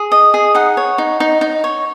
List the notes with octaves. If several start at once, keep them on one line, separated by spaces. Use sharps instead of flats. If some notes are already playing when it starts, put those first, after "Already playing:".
Already playing: G#4
D#5
G#4
D#4 F#5
C#5
D#4
D#4
D#4
C#5